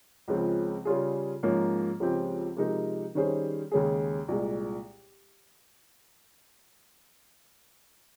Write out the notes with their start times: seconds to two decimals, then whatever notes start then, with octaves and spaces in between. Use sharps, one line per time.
0.28 C#2 C#3 F3 G#3 C4
0.85 C#3 G3 C#4 F4 G#4
1.43 G#2 F3 A#3 C#4
2.00 C#2 C#3 F3 C4 G4
2.57 C3 F3 G#3 D#4 A#4
3.15 D#3 G3 C#4 G#4 C5
3.71 D#2 C#3 G#3 C#4 G#4
4.28 C2 A#2 G#3